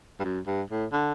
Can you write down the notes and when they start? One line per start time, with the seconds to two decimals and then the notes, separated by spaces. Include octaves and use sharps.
0.20 G2
0.24 F#2
0.46 G2
0.70 A2
0.92 D3